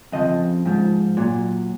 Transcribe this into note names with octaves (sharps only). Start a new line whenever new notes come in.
F2 C#3 F3 D#5
G#2 F3
A#2 F#3